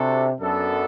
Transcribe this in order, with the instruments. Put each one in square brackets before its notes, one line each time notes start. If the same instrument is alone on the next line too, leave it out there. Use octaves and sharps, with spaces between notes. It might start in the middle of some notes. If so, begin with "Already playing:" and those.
Already playing: [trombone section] C3 [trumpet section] D4 F#4 A4
[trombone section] F#2 [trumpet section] B3 D4 A4